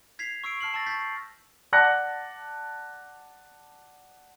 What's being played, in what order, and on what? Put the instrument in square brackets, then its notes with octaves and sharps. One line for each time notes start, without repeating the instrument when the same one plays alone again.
[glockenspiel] G#6 B6 C7 F7
C#6 E6 C7 D7
A5 F6 C7 F#7
A5 C#6 E6 A6 A#6
C#6 G6 A6 B6
C7
[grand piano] D5 F#5 A5 F#6 A#6 C#7